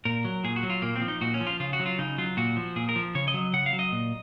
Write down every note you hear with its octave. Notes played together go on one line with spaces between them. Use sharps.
A#2 A#4
F#3
A#2 G#4
F#4
F#3
F4
A#2 A#3
C4
F3
D#4
A#2 F#4
C#4
F3
F4
C#3 F4
F#4
F#3
F4
C#3 D#4
F#3 F4
A#2 F#4
F3
A#2 G#4
A#4
F3
C#3 C#5
D#5
F#3
C#3 F#5
F5
F#3
D#5
A#2